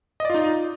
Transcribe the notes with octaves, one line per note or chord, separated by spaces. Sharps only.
D#4 F4 D5 D#5